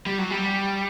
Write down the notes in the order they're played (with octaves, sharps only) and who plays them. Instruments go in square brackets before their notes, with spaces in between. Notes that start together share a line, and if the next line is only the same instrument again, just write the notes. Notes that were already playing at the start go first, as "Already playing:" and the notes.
[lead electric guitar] G3
F#3
G3